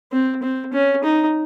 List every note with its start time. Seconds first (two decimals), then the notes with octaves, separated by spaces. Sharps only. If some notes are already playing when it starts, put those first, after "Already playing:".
0.12 C4
0.43 C4
0.73 C#4
1.04 D#4